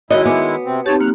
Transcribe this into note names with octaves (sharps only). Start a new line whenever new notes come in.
D#3 G#3 E4 F#4 C#5 D#5
B3 G#5 D6
C3 C4
C4 D#4 G4 C#5 A5
F#2 A#3 F6 F#6